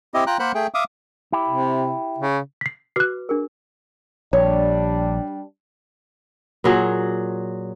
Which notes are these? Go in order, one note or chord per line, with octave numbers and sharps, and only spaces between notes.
C4 E4 G4 D#5
F4 G5 A#5 F#6
A#3 A#4 C5 F#5 B5 F#6
A3 G#4 G5
E5 F5 D6 D#6
E4 G4
C3
C#3
B6 C7
F#4 B4 D6 F#6 C7
D4 G#4 A#4
A#1 G3 D4 C#5
A#2 F#3 G#4